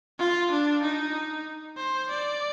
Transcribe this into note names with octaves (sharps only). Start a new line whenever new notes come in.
F4
D4
D#4
C5
D5